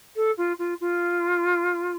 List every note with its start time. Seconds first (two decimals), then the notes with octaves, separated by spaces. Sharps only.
0.16 A4
0.37 F4
0.58 F4
0.80 F4